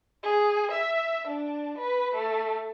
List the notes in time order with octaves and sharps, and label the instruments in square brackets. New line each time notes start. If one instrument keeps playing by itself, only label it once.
[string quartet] G#4
E5
D4
B4
A3